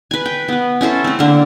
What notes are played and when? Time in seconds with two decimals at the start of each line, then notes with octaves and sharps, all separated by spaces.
0.11 B4 G#5
0.26 G5
0.48 B3 B4
0.81 C#4 E4 A4 C5
1.04 A3 C4
1.19 D3 A#3